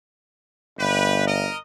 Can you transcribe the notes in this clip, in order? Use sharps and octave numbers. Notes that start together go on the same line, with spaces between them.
G1 G4 B4
A#4 D#5